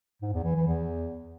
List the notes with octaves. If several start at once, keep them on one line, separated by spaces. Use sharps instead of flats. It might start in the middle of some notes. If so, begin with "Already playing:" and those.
G#2
E2
E3
E3
E2